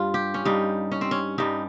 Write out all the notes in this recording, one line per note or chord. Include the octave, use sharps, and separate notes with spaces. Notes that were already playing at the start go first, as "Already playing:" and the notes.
Already playing: G2 G3 F4
G4
C#4
G2 G3 D#4
C#4
C4
C#4
G2 G3 D#4